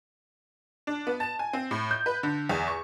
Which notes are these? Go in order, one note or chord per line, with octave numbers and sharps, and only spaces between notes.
D4
B3
A5
G#5
C4
A2
G6
B4
D3
E2
C#6